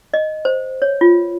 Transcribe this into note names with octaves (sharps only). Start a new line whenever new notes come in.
D#5
C5
C#5
F4